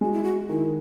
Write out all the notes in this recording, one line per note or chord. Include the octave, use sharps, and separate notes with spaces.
G#3 F#4
E4
F#4
D#3 E4